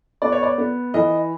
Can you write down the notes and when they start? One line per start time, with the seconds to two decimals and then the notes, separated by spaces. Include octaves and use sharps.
0.22 B3 D5
0.32 C#5
0.43 D5
0.58 B3
0.94 E3 D#5